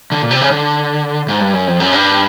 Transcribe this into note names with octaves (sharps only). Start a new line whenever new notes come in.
D3
A#2
C3
C#3
D3
G#2
G2
F#2
F2
F#2
G2